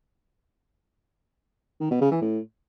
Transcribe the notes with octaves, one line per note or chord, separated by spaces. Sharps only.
D#3
B2
C#3
E3
A2